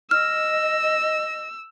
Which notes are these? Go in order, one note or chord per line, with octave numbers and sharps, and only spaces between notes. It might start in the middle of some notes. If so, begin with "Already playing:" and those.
D#5 E6 F6